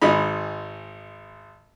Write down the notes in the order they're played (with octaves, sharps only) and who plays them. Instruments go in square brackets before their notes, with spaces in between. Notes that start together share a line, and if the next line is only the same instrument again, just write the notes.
[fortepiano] G#1 G#3 D#4 B5